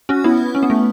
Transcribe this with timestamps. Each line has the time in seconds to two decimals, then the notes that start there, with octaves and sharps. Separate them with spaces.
0.09 C#4 F#4
0.24 B3 E4
0.55 C#4
0.63 B3
0.70 A3